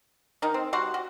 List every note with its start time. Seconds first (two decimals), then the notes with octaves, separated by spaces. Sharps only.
0.42 D#3 D#4
0.54 C4
0.73 G3 F#4 F#5 C6
0.94 F#4